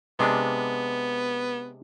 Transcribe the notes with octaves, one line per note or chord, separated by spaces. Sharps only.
C3 G#3 B3 D4